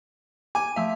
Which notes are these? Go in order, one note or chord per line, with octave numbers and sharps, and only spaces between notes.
G#5 D6
F3 A3 E5 F5